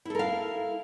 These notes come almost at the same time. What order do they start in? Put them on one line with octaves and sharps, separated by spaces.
E4 A4 A#4 F5